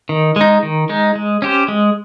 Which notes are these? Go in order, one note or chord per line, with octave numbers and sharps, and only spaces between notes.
D#3
G#3 D#4
D#3
G#3 D#4
G#3
C#4 G4 C5
G#3